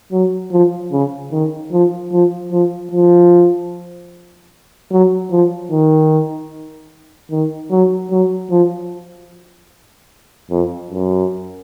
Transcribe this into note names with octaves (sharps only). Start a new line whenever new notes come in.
F#3
F3
C#3
D#3
F3
F3
F3
F3
F#3
F3
D#3
D#3
F#3
F#3
F3
F2
F#2